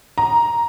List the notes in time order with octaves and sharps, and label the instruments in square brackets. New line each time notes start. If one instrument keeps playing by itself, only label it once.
[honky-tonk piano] A#5